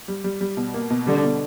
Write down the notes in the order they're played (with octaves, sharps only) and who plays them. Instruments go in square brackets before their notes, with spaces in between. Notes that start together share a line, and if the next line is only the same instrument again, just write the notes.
[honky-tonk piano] G3
G3
G3
B2
A#3
B2
[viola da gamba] D3 [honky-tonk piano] G3
[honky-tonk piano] B2